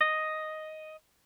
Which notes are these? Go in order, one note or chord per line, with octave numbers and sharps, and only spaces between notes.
D#5